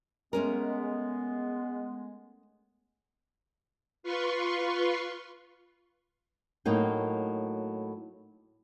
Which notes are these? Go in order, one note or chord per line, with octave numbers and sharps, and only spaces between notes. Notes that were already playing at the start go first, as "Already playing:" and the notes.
G#3 A3 B3 C#4 A#4
F4 B4 C6 C#6
A2 F#3 A#3 D#4 G5